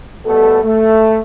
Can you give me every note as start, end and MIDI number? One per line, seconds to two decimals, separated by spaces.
0.25 0.58 47
0.25 0.58 55
0.25 0.58 57
0.25 0.58 59
0.25 0.58 69
0.63 1.19 57